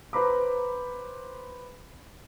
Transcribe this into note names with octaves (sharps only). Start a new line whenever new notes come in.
B4 C5 A#5 B5 D6